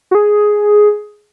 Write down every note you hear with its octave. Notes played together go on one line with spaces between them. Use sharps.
F#4
G#4